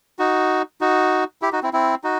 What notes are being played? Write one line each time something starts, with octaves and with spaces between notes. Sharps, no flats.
D#4 F#4
D#4 F#4
E4 G4
D#4 F#4
C4 E4
C4 E4
D#4 F#4